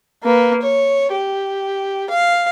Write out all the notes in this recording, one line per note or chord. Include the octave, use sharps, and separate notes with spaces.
A#3 B4
C#5
G4
F5